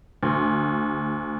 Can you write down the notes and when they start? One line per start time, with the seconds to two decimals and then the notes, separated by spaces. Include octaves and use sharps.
0.23 D2